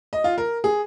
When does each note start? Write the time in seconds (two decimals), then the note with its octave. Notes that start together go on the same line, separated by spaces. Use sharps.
0.13 D#5
0.24 F4
0.38 A#4
0.64 G#4